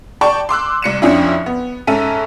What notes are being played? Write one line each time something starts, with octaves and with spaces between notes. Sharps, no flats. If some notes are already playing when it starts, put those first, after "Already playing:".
D5 G5 A5 C#6
C6 D6 E6 F#6
C2 C#7 E7
F2 F3 C#4 D4 E4
B3
G#2 C#4 A4 E5 D#7